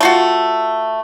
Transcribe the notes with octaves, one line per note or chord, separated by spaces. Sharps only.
A3 F4 F#4